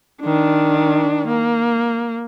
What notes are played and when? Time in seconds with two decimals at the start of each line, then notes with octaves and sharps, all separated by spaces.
0.22 D#3 D4
1.28 A#3